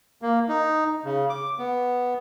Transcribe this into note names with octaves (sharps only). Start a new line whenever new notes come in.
A#3
D#4
C#3
D6
B3